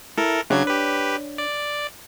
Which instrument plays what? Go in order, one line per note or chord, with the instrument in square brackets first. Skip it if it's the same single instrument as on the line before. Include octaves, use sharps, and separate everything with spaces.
[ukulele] E4 [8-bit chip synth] A4 A#4
[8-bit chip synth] C#3 F#3 G#6 [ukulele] D4 C#5
[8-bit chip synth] G4 B4
D5